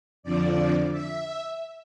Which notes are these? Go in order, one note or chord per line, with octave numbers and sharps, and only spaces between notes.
F2 D3 F3 D5
E5